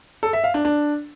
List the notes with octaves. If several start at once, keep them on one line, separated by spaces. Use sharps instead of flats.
A4
E5
F5
D4
D4